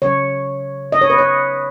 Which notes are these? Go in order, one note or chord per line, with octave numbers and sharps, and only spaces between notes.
C#3 F#3 C#5
D#5
C#5
B4
C#5